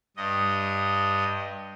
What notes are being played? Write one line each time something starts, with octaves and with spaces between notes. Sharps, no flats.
G2 D#5